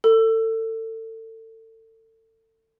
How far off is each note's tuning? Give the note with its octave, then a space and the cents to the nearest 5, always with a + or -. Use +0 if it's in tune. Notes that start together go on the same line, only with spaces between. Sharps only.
A4 +30